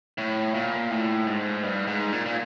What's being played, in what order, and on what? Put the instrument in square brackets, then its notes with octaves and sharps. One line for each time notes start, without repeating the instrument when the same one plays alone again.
[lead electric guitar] A2
A#2
A2
G#2
G2
G#2
A#2
A#2